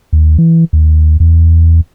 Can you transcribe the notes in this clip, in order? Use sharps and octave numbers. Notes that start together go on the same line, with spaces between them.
D#2
E3
D#2
E2